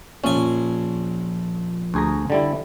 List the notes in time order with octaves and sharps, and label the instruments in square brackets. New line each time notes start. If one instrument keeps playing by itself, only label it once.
[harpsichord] A#1 G#5 [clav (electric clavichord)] C#4
[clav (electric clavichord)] D2 G#4 A#5
D3 G3 E4